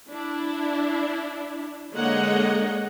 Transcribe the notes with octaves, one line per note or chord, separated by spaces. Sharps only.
D4 E4
D3 G#3 A#3 C#5 D#5 F#5